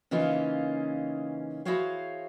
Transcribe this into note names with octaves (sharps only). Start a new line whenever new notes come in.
C#3 E3 A#3 C#4 D#4 F4
E4 F#4 G#4 C5 C#5 F5